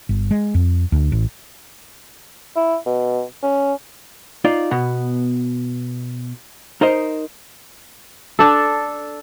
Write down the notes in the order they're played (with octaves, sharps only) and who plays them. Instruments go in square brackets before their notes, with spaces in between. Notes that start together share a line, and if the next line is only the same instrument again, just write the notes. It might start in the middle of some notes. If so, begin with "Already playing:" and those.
[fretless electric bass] G1
G#3
F2
D2
A1
[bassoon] E4
B2
C#4
[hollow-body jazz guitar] D#4 F4 D5
B2 B3
D#4 A#4 C5 D#5
[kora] D4 A4